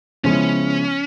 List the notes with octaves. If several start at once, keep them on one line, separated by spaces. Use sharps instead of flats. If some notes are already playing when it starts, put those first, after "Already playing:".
C#3 F3 G#3 B3 C#4 E4